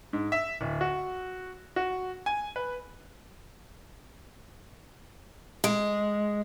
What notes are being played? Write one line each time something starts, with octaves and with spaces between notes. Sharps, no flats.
G#2
E5
D1
F#4
F#4
G#5
B4
G#3